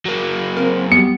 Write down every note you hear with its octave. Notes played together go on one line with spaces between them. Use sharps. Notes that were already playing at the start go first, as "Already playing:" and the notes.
F#3 A#3
C4 A#4
G3 B3 C#7